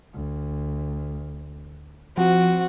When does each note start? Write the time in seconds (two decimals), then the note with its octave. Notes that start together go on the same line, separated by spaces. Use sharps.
0.14 D2
2.17 F3 C4 F#4